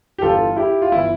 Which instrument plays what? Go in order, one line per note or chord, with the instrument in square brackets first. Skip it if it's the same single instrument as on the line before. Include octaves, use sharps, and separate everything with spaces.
[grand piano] G4
G1 G2 E3 F4 A4
E4 G4
F4
G1 E3 E4